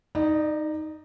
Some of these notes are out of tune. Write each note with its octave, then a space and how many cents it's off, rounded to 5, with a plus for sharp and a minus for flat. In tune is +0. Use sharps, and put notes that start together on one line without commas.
D#4 +0 D5 +35